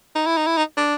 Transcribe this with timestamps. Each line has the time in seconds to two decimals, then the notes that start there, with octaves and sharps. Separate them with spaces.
0.15 D#4
0.26 E4
0.37 D#4
0.46 E4
0.57 D#4
0.77 D4